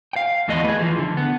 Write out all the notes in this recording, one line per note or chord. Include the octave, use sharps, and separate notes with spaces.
F5 G5
D#2 E3 A3 B3 D#5
G#4 B4
E3 F3
D3
B3